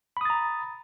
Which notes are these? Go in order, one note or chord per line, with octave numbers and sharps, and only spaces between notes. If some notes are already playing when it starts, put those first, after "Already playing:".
A#5 B5 D#6 A6